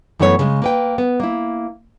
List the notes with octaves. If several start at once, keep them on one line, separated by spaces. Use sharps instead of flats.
F#2 E3 A3 B3 F4 C#5
C#3 G#3
A#3 B4 G5
B3
A#3 E4